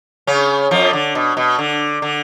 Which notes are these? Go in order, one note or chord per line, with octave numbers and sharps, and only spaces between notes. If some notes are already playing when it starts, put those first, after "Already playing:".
C#3 C#4
F2 F3
D3
B2
B2
D3
D3